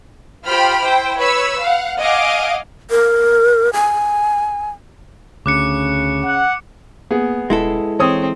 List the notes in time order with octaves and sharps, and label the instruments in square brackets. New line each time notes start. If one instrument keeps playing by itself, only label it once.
[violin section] F4 G4 C5 G5 B5 F6
E4 C5 G5
B4 C#5 B5 E6
F5 F#5
D#5 F5 F#5 G#5 D6
[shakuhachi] A#4
G#5
[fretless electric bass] D2 [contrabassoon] C#3 [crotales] D6 F#6 C#7
[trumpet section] F#5
[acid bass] A#3 [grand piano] B3 G#4
[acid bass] D#1 [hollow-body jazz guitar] G#3 E4 A4
[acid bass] E3 [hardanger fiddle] C4 [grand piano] C#5 D#6